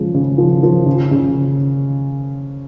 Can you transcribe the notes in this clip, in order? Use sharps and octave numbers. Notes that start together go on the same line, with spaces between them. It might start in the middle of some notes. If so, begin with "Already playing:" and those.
Already playing: C#3 F3 G#3
C#3
F3
F3
C#3
C#3